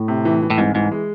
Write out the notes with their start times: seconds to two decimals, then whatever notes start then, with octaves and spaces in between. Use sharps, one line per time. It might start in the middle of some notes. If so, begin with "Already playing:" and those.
Already playing: A2
0.08 C3
0.25 E3
0.42 E3
0.50 A2
0.58 C2 G#2
0.75 G#2 E3
0.91 G#3